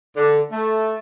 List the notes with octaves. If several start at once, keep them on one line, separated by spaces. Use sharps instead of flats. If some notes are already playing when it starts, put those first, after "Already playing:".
D3
A3